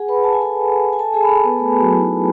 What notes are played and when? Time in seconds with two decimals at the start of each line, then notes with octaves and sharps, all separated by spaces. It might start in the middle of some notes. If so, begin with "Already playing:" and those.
Already playing: G#4 F#5 G#5
0.09 B4 B5
0.23 A5
0.33 G#5
0.42 A4 A5
0.93 G#5
0.99 A4 A5
1.14 G#4 G#5
1.23 B5
1.29 A4 A5
1.44 B3 B4
1.59 A3 A4
1.79 F#3 F#4
1.91 E4
2.00 D#4